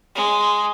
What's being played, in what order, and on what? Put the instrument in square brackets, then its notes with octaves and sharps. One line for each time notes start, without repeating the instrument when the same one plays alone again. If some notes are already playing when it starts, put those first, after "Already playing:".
[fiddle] G#3